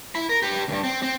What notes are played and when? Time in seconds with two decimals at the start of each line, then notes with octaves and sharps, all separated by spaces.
0.15 E4 B5
0.29 A#4
0.42 G4 B4
0.68 D2 G2
0.84 C4
1.02 C4